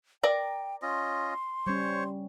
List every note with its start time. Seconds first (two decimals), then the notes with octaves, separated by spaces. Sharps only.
0.23 A#4 D5 G5 A#5
0.82 C#4 F4 D#5 C6
1.67 G3 C#4 C5 C#5 C#6